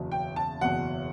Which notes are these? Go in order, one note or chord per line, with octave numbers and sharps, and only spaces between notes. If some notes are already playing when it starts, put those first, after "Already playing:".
Already playing: F#1 E2 B2
G5
A5
F#1 E2 B2 F#5